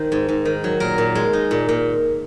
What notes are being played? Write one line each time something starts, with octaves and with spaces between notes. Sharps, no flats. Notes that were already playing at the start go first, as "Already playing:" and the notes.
Already playing: D#3 C5
G#2
G#2
D#3
F#3
A#2 A#4
A#2
G#3
D#4
A#2
A#2